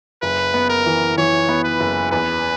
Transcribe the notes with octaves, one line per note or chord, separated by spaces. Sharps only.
F#1 B4
B3
A#4
E3
E3 C#5
B3
B4
F#1
E2 B4